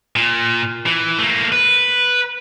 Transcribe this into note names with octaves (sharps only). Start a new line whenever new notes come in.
A#2
E3
A3 A#3
B4